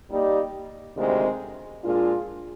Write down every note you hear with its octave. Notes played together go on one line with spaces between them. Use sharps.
G3 A#3 D#4 G4 D5
D2 C3 D#3 G#3 C4
A#2 G#3 D4 F4